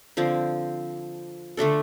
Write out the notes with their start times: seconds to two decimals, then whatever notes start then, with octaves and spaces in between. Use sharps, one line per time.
0.17 D3 F3 C4
1.57 D3 A3 D4 A4